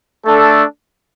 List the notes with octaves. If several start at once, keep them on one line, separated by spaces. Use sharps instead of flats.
A3 D4 A4